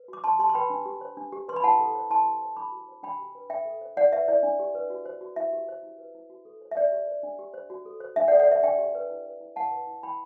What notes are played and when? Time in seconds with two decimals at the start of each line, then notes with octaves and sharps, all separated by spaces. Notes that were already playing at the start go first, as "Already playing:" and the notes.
Already playing: B4
0.08 F#4 D6
0.24 D4 A5 C6
0.39 G4 A5 C6
0.49 C6
0.55 B4 G5 B5
0.70 D4
0.86 G4
1.01 C5
1.17 D4
1.32 G4
1.48 B4 C6
1.56 B5
1.64 E4 F#5 A5
1.80 A4
1.95 C5
2.10 E4 A5 C6
2.26 G4
2.41 C5
2.56 D4 B5 D6
2.72 F#4
2.89 C5
3.03 D4 G5 B5
3.19 G4
3.35 B4
3.50 D4 E5 G5
3.65 A4
3.81 C5
3.97 E4 D5 F#5
4.12 B4 E5
4.28 E4 D5
4.43 D4
4.59 G4
4.75 B4
4.90 F#4
5.05 C5
5.21 F#4
5.36 E4 E5
5.53 G4
5.68 C5
5.83 E4
5.98 B4
6.15 E4
6.30 F#4
6.45 A4
6.61 C5
6.71 E5
6.76 D4 D5
6.92 G4
7.08 C5
7.23 D4
7.39 G4
7.54 C5
7.70 F#4
7.85 A4
8.00 C5
8.16 D4 E5
8.28 D5 F#5
8.32 A4
8.39 D5 F#5
8.48 C5 E5
8.63 D4 E5 G5
8.78 G4
8.95 B4
9.09 E4
9.25 B4
9.40 E4
9.56 E4 F#5 A5
9.72 B4
9.87 E4
10.03 E4 G5 B5